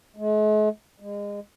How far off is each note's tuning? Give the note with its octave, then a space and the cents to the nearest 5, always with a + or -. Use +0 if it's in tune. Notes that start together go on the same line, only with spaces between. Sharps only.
G#3 +45
G#3 -30